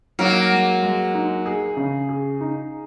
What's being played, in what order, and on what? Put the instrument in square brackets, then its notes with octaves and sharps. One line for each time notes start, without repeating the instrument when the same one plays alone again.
[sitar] F#3 A#3 [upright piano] D#4
[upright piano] G#3
G#3
D#4
G#4
C#3
G#4
D#4